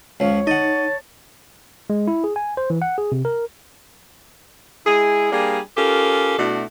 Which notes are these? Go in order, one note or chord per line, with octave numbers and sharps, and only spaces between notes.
C#2 F3 C#5
D#4 D#5 F#5 A5
G#3
E4
G#4
G#5
C5
E3
F#5
G#4
C3
A#4
G#3 E4 G#4
G3 A#3 D4 G#4
C#4 F4 G4 A4 A#4
B2 A3 D4 E4 F#4